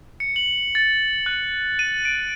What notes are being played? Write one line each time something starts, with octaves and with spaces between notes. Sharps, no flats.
C#7
F#7
A6
F#6
D#7
D7